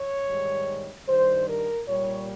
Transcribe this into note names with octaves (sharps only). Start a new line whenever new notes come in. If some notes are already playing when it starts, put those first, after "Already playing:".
Already playing: C#5
G#2 D#3 G3
G2 D#3 G3 C5
A#4
A#2 G3 C#5